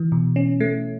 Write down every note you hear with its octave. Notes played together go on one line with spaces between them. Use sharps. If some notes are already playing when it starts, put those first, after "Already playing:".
Already playing: E3
B2
C#4
A3